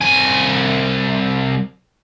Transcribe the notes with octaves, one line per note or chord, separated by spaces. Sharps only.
C2 G#5